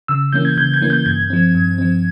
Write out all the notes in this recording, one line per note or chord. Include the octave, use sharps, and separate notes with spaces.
C#3 E6
E3 A#3 C#4 G6
G#6
C#3 G6
G#6
E3 A#3 C#4
G6
G2 G#6
F3 C4
G2
F3 C4